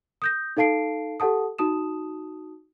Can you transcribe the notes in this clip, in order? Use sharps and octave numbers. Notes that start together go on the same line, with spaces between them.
D#6 G6 A#6
D#4 A4 F5 A5 C7 D7
G4 A4 F#5 A5 D#6
D#4 F#4 A5 D#6 E7